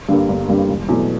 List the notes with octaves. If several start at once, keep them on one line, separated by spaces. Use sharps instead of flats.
G2 D3 G3 A#3
G1
G2 D3 G3 A#3
E1
E2 B2 F#3 A3